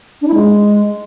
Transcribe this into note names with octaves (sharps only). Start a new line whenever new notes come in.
D4
E4
G#3